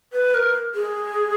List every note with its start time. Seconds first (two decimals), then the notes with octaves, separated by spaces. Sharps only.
0.13 B4
0.34 A#4
0.75 G#4